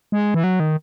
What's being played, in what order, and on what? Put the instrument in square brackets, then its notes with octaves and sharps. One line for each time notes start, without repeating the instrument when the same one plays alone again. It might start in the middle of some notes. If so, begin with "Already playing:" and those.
[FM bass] G#3
E3
F#3
D#3